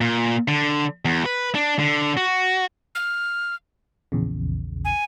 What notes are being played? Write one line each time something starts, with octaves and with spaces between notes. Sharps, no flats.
A#2
D3
E2
B4
D4
D3
F#4
F6
A#1 E2 C#3
G#5